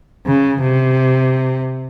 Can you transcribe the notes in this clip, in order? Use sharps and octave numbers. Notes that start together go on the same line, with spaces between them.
C#3
C3